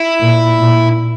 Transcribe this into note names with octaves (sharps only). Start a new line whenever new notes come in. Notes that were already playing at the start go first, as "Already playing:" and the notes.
Already playing: E4
A#2
A#2